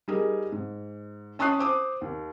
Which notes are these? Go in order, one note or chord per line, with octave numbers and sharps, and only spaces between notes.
G3 D#4 G#4 A#4
G#2
C#4 A5 C#6 D#6 F#6 C7
C5 D6 D#6
D#2